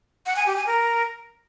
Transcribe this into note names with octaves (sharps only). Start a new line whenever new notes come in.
F#5
G#5
G4
G#5
A#4